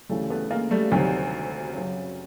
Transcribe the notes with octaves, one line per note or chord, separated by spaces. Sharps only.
D2 C#3 E3 G3 A3
A3 B3
G#3 A#3
G3 A3
D2 C3 D#3 F#3 G3
F#2 C#3 F#3